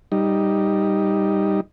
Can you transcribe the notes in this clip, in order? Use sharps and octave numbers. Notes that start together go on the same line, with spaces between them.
G3 D#4